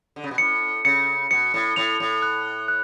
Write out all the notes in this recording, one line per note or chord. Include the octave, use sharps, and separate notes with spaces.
D3
C#3
B2
A2 C#7
C#3 C#7
B2 C#7
A2
A2 F7
A2
F#6
F#6